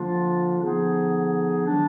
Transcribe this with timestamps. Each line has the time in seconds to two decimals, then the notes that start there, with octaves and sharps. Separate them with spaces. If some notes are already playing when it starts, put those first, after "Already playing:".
Already playing: D3 F3 A#3 D4 F4
0.59 D3 F3 B3 D#4 G#4
1.66 D#3 F#3 D4